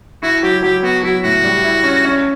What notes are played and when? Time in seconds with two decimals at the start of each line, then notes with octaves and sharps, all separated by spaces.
0.23 E4 F#4
0.43 F#3 G4
0.63 F#3 G4
0.83 B3 F#4
1.03 F#3 E4
1.24 A2 F#4
1.44 G3
1.64 E4
1.84 C#4
2.05 C#4